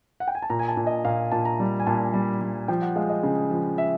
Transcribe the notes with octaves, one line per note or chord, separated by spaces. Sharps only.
F#5
G5
G#5
A5
A#2 A#5
G#5
A5
A#2
D#5
A#2 F5
A#2 A5
A#5
G3
G#5
A#2 A5
G3
G3
F3 G5
F#5
G#3 F5
D#5
C#3
F3
E5